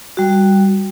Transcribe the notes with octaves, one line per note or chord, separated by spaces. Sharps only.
G3 F#4